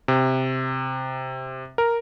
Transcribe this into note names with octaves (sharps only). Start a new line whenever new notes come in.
C3
A#4